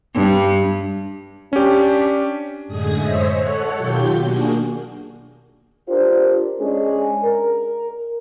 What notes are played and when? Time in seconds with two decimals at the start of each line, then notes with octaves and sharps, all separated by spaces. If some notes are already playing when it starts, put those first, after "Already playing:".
0.15 G2
1.53 C#4 D4 G4
2.67 F#2 A2 D3 G#3 G#4 D#6
2.96 C5 C#5 D#5 E5
3.37 A4 C#5 F#5
3.76 B2 D#3 F#3 F4 G4 G6
4.19 A#3 D4 F#4 G#4
5.89 D4 F4 G4 A#4 C5 D5
6.60 G#3 C#4 D4 G#4
7.23 A#4